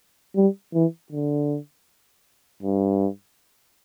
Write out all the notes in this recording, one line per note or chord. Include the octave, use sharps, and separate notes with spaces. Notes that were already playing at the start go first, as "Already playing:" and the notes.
G3
E3
D3
G2